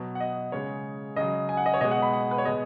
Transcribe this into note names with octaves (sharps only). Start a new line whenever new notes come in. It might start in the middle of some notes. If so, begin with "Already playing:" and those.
Already playing: B2 F#3
F#5
D#5
C#3 G#3 C#5
C#3 F#3 D#5
G#5
F#5
D#5
C#5
B2 G#3 D#5
F#5
B5
F#5
B4
C#5
B2 G#3 D#5